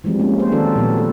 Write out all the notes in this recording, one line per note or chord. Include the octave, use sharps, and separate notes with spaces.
E3 F3 G3 G#3 C4
G#3 A#3 C#4
A#3 C5
D#3 C4 D4 F#4 A4 A#4
A#2 F3 B3
A4